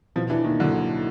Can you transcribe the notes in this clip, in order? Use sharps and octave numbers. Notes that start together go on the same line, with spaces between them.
B2 F3
E3 D4
D#3 A#3
D3 F#3